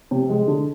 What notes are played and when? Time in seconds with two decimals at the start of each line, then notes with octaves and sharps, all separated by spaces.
0.11 C3
0.29 G#3
0.48 D3